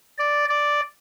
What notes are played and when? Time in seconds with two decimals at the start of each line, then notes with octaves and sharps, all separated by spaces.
0.19 D5
0.49 D5